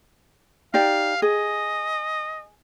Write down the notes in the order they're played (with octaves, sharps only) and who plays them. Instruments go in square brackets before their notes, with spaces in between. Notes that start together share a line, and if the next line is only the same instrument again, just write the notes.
[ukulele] D#4 G4 D5 [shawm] F5
[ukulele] G#4 [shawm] D#5